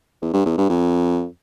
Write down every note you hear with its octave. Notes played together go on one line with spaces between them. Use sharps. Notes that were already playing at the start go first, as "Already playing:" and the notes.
E2
G2
E2
G2
F2